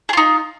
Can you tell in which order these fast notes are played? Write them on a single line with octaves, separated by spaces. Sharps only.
G#4 F4 D#4